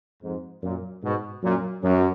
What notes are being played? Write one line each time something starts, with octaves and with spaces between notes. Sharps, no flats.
F2 G#2
F#2 A#2
G#2 B2
F#2 A#2
F#2